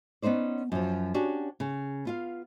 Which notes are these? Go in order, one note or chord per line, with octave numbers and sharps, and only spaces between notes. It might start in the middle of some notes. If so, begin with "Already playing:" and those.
B3 C#4 D#4 C5 D5
F#2 F3
C#4 D4 F#4 G4
C#3
B3 F4 F5